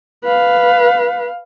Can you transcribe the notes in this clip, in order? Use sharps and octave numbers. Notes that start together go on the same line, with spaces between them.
B4 F5